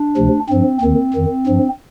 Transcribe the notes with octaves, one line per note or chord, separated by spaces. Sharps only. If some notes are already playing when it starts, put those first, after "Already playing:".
Already playing: D4
D2 C3 F3
G2 F3 C4
D#2 D#3 C4
F2 D#3
G2 F3